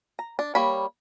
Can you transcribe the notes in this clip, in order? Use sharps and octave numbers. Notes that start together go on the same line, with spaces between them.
A#5
D4
G3 A#3 C#5 B5